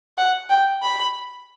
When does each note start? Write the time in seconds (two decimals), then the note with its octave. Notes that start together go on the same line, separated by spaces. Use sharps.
0.18 F#5
0.50 G5
0.82 B5